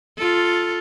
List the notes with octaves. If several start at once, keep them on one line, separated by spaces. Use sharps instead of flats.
F4 A4